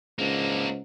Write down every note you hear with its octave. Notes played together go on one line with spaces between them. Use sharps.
C#2 G#2 A#3 D4